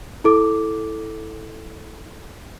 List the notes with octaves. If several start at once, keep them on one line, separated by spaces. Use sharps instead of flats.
E4 A4 D6